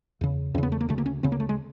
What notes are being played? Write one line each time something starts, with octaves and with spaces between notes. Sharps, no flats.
E2 C#3
E2 C#3 B3 C#4
A3
A#3
D2 C#3 A3
A#3
C#4
D2 C#3 C4
A#3
A3
G#3